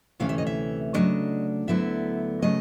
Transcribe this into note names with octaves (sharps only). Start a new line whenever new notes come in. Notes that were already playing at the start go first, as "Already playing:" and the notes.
D2 C3 E3 A3 C#4 F5
E5
D#5
E5
C#3 F#3 A3 D4 D#5
D2 D3 F#3 B3 E4 E5
C#3 F#3 A3 D#5